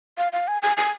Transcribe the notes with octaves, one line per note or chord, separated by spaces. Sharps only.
F5
F5
G#5
G#5
G#5